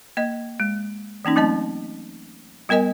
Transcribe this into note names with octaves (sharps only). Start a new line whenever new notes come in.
A#3 D#5
G#3
E3 A#3 C#4 D#4
F#3 A3 C4 D#5 A5
G3 B3 A#4 D#5 G#5